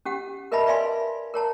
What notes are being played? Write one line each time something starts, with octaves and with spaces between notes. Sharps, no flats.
C#4 G4 F#5
A#4 B4 D#5 E5 A5 B5
B4 D5 E5 F5 G#5 C6
A#4 C#5 A5 A#5